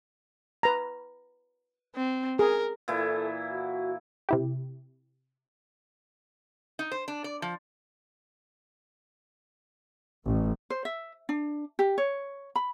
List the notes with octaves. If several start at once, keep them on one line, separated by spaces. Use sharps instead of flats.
B4 A#5
C4
G#4 A#4
A#2 E3 E4 A4
F#4
C3 E4 G4
D#4
C5
D4
D5
F3
A1
C5
E5
D4
G4
C#5
B5